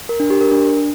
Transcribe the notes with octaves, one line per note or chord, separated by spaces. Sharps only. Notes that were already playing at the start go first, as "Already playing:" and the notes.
A#4
D4
G4
A#4
D4